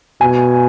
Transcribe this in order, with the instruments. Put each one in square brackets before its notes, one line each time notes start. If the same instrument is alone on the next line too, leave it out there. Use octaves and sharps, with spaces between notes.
[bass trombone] B2 [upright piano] G#5